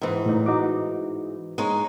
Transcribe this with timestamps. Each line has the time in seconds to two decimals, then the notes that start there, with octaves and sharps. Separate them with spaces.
0.02 G#2 E3
0.26 A2 D#4
0.46 D#4 F#4 D6
1.58 G#3 D#4 C#5